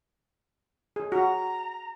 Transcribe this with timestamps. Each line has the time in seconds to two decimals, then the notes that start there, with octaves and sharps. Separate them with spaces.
0.96 G#4
1.12 F#4 A#5